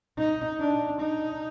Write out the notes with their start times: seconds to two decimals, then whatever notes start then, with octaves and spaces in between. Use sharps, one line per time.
0.18 D#4
0.60 D4
1.01 D#4